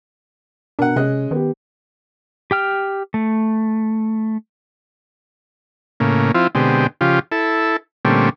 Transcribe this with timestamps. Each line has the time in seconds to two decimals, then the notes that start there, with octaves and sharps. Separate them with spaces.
0.79 B2 D4 A#4 F#5
0.96 C3 G#3 C#4 D#5 F#6
1.31 D#3 B3 G4
2.51 G4 G5 F6
3.14 A3
6.00 A2 C#3 A#3
6.34 F3 C4 E4 F4
6.55 B2 D3 G#3 C4 G4
7.01 C#3 F3 F4 G4
7.32 E4 A4
8.05 A#2 D3 G3 A3 C4 C#4